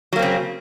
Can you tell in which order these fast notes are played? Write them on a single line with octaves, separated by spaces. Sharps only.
F#3 A#3 C4 C#3